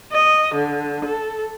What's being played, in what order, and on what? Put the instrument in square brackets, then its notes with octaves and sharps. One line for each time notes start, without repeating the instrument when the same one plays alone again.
[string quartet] D#5
D3
A4